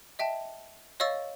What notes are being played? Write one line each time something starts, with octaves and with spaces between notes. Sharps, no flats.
D#5 E5 G5 A5
C#5 D#5 F5 C#6 E6 A6